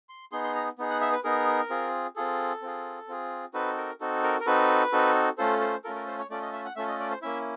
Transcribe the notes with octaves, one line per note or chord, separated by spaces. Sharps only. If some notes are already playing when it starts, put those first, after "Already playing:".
C6
B3 D#4 G#4 C6
C6
A#5
B3 D#4 G#4
F#5
E5
B4
B3 D#4 G#4 A#4
C4 F4 G#4
C4 F4 G#4 A4
C4 F4 G#4
C4 F4 G#4
C4 D#4 F#4 A4 B4
A#4
C4 D#4 F#4 A4
A#4
A#4
C4 D#4 F#4 A4 B4
C4 D#4 F#4 A4
A3 C#4 F4 A4 C5
C5
A3 C#4 F4 A4 A#4
A#4
C5
C#5
A3 C#4 F4 A4 D5
D#5
E5
F#5
A3 C#4 F4 A4 E5
D#5
D5
C5
A#3 C#4 E4 E5